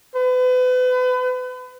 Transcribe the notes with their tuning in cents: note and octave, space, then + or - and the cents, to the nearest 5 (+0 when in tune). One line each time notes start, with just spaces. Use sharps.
B4 +35